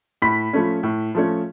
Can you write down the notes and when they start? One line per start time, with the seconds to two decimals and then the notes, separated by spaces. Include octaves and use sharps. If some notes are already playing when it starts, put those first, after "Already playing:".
0.22 A2 B5 B6
0.53 F3 A3 C#4
0.83 A2
1.15 F3 A3 C#4